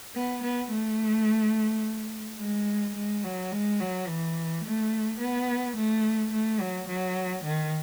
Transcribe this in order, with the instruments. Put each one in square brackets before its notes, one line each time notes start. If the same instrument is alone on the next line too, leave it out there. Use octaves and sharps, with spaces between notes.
[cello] B3
B3
A3
G#3
G#3
F#3
G#3
F#3
E3
A3
B3
A3
A3
F#3
F#3
D#3